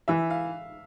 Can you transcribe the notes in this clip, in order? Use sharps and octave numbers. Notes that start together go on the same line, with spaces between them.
E3 E5
F5